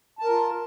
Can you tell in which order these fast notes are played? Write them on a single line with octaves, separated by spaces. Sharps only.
A5 A#4 F4